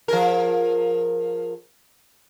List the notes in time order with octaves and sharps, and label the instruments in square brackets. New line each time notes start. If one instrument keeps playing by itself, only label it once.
[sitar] F3 G#4 A#4